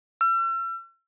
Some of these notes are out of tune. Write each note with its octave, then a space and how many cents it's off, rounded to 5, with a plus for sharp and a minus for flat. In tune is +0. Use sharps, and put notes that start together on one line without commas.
E6 +40